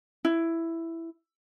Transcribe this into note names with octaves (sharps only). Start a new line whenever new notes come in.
E4